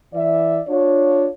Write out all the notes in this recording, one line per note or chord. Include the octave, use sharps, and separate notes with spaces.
E3 D5 E5
D4 F4 C#5